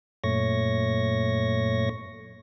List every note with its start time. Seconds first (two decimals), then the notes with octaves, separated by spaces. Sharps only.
0.24 F#2 A#2 A3 C#5 C#6 A#6